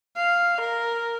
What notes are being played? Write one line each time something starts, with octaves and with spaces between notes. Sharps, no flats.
F5
A#4